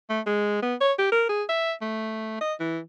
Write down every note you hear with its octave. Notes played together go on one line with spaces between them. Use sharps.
A3
G#3
B3
C#5
G4
A#4
G#4
E5
A3
D#5
E3